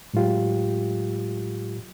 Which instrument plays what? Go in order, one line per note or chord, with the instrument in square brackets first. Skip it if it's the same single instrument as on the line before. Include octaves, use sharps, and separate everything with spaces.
[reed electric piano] A2 F#3 G#3 F4 G4